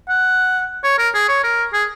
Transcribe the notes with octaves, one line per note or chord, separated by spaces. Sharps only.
F#5
C#5
A#4
G#4
C#5
A#4
G#4